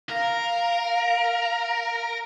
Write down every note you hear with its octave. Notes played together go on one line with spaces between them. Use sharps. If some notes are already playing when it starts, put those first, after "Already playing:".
A#4 F5